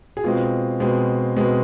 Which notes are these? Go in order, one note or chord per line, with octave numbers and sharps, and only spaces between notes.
G#4
B2 G#3 C4 F4
B2 G#3 C4
B2 G#3 C4